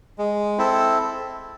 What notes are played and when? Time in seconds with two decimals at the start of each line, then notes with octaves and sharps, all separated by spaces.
0.19 G#3
0.58 C4 E4 A4